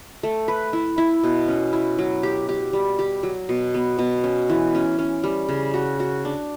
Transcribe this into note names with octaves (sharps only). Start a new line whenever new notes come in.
A3
B4
E4
E4
B2
C#4
E4
F#3
G4
G4
G3
G4
F#3
B2
B3
B2
C#4
E3
C#4
C#4
G3
C#3
F#4
F#4
D4